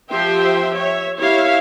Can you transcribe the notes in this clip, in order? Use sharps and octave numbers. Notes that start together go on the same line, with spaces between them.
F3 G4 C5 E5 G5
C#5 E5
E4 G4 C#5 E5 F5